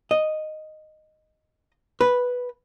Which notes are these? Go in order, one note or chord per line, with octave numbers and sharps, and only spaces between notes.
D#5
B4